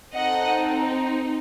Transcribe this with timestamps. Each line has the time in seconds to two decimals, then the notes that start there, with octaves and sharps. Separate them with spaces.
0.14 C4 D#4 A4 D#5 F#5